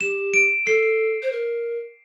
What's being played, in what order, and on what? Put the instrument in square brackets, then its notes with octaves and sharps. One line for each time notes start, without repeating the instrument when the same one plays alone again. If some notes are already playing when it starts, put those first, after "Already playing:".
[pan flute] G4 [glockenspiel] E7
[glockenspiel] D7
[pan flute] A4 [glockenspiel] C7
[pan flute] C5
A#4